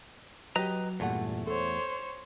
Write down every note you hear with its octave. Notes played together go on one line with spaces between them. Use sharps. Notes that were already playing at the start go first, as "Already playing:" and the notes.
F#3 G4 B4 D#5 A#5
E2 G2 A#2 A3 F#5
A4 C5 C#5